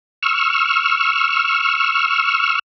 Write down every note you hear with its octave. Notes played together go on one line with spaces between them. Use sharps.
C#6 E6 F6